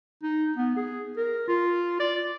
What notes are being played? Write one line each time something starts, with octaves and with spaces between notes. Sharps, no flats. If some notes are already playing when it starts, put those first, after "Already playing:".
D#4
B3
G#4
A#4
F4
D5